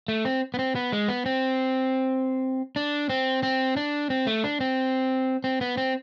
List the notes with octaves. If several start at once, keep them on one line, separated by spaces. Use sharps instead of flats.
A3
C4
B3
C4
B3
G#3
B3
C4
D4
C4
C4
D4
C4
A3
D4
C4
C4
B3
C4